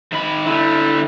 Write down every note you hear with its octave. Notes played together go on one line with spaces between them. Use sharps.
D#3 B5
D3 G3 E4